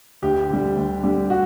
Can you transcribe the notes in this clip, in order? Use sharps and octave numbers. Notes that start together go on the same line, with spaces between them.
D2 G4
D3 G3
D2
D3 G3
F#4